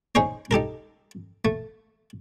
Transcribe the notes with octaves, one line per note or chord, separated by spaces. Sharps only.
C#4 D#4 G#4 C5 C#5
D#4 G4 A4 A#4
A3